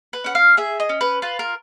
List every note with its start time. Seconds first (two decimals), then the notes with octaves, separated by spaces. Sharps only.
0.13 B4
0.24 C#4 F#5
0.35 F5
0.57 G#4 E5
0.80 D#5
0.89 C#4
1.01 B4
1.22 F4 B4
1.39 A#4